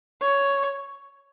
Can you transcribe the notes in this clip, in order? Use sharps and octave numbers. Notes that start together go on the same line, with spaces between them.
C#5